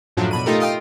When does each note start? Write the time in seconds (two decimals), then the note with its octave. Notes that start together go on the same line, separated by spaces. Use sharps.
0.17 F#2 A2 F3 F#3 D4
0.31 B2 B5 D#7
0.46 A3 D#4 F4 G4 A4 A#4
0.60 F4 D#5 F5 G5 D#6